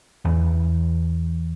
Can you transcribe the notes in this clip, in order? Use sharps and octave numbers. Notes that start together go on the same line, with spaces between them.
E2